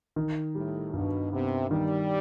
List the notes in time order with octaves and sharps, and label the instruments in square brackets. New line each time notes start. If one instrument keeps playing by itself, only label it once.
[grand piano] D#3
[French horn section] A2 [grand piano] G3
[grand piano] G2 [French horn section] B2
[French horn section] C3 [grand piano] B3
[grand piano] D#3 [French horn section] G3